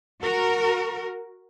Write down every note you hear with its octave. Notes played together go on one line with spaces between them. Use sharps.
F#4 A#4